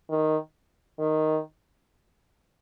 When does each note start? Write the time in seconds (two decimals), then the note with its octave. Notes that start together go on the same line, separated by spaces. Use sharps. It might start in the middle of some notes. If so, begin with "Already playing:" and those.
0.10 D#3
0.99 D#3